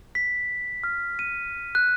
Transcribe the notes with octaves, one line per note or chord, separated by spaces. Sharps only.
B6
F6
D#7
F#6